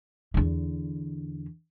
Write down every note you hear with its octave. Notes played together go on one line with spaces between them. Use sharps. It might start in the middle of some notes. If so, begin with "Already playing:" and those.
E2 D3